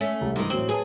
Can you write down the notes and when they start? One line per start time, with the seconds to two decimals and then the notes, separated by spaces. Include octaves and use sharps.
0.01 A3 C#4
0.21 C2 G3
0.36 G2 C3 D#3 E3
0.50 A2 F#3 C4 F#7
0.69 G#4 B4 C#5 A5